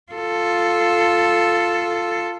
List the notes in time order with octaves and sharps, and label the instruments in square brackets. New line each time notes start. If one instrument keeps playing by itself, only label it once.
[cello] F4 A4